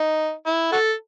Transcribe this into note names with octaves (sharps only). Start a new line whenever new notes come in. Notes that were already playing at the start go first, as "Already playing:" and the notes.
Already playing: D#4
E4
F#4 A4